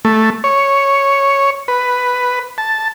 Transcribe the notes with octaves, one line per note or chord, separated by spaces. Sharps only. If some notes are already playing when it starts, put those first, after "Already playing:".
A3
C#5
B4
A5